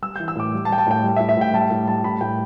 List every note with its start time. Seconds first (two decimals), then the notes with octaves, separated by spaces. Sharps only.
0.02 G3 E6
0.16 E3 G6
0.28 E6
0.36 A2 D6
0.53 G3
0.65 A5
0.70 G3 G5
0.78 A5
0.87 A2 G5
1.04 G3
1.16 A2 E5
1.29 E5
1.37 A2 G5
1.53 G3 A5
1.71 A2
1.87 G3 A5
2.04 A2 B5
2.21 A2 G5